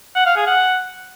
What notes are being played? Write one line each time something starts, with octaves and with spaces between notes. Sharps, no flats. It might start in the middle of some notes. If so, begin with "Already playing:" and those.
F#5
F5
G#4
F#5